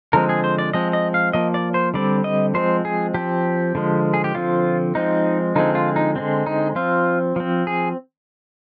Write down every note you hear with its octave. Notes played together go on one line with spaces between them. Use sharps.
D3 F3 G#3 C4 A#4
G#4
C5
D5
F3 G#3 C4 D#5
D#5
F5
F3 A#3 D#5
D5
C5
D3 G3 C4 D5
D#5
F3 G#3 C4 C5
G#4
F3 C4 G4
D3 F3 G#3
G#4
G4
D3 F3 C4 F4
F3 G#3 C4 D#4
D3 F3 G#3 C4 D#4
F4
D#4
D3 G#3 C4
D#4
F3 C4 F4
F3 C4
G#4